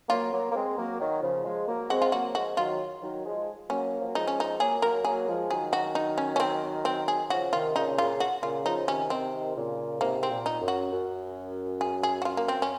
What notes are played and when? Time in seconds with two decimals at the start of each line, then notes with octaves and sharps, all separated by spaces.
0.09 F#3 A#3 F4
0.32 F#3 A#3
0.51 A#3
0.55 G#3 C4
0.77 F#3 A#3
1.00 D#3 F#3
1.22 C#3 F3
1.45 F3 G#3
1.67 F#3 A#3
1.90 G#3 C4 F#4
2.02 F4
2.12 F#3 A#3 F#4
2.35 F3 G#3 F#4
2.57 D#3 F#3 F4
3.02 D#3 F#3
3.25 F3 G#3
3.69 F#3 A#3 C#4
4.00 F3
4.07 F#3
4.15 F3 G#3 D#4
4.27 C#4
4.40 D#4
4.52 C4
4.60 F#3 A#3 G#4
4.82 F#3 A#3 A#4
5.05 F#3 A#3 G#4
5.28 F3 G#3
5.50 D#3 F#3 G#4
5.73 F#4
5.95 D#4
6.18 C#4
6.36 C#4
6.40 C4
6.85 C4
7.08 G#4
7.30 C#3 F3 F#4
7.53 C3 D#3 F4
7.75 A#2 C#3 D#4
7.98 A#2 C#3 F4
8.20 F#4
8.42 A#2 C#3 F4
8.65 C#3 F3 D#4
8.88 C3 D#3 C#4
9.10 C3 D#3 C4
9.55 A#2 C#3
10.00 G#2 C3 A#3
10.23 C4
10.30 A#2
10.46 D#4
10.61 F#2
10.68 F#4
10.91 F#2
11.81 G#4
12.03 G#4
12.22 F#4
12.25 F4
12.37 A#3
12.48 C4
12.62 C#4